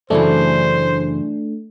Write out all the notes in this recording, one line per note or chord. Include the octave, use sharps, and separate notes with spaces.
F#2 C#3 E3 A3 D4 C5